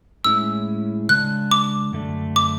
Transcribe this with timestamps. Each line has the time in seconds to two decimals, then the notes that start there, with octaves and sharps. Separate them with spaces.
0.25 A2 G#3 C#4 E4 E6
1.09 C#3 G#3 D4 F#6
1.51 D6
1.93 F#2 D3 A3 D4
2.36 D6